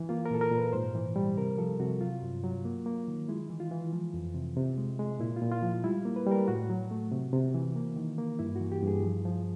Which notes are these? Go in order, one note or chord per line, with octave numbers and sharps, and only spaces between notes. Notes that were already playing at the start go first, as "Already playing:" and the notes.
Already playing: E3
A#3 F4
A#4
A#2 A4
A#4
A#2
B4
G#2 C5
E3
G3
C3 A#4
F3 A4
C3 F#4
F#3 F4
G2
F#3
A#3
A#3
D#3
G#3 E4
E3
F4
E3
F3
F2
C3
C3
G#3
G#3
A#2 E4
F4
A#2
F4
F3
G3 E4
A#3
B4
G3 A#4
A2 F#4
F#3
A3
C3
C3
E3
A#3
D#3
A#3
G2 E4
E3 F#4
G4
G2
G#4
F3
F3